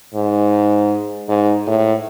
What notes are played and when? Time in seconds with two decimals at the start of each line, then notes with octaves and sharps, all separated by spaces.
0.14 G#2
1.29 G#2
1.67 A2